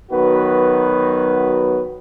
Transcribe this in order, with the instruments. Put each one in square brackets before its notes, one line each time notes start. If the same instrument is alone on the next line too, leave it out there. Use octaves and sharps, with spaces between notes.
[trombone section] D#3 F#3 B3 F#4 B4